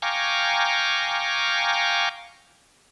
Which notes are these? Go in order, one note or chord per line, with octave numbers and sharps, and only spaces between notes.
F5 G5 G#5 A#5 C#6 D6